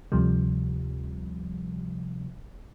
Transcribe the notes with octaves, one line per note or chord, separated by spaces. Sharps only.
D2 C3 F3 G3